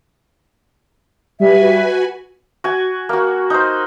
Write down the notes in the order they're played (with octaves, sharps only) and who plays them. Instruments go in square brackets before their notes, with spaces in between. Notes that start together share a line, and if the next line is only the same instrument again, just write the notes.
[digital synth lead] G3 [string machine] F#4 B4 G#5 [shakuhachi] E5
[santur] F#4 G#5
A#3 F#4
D#4 C5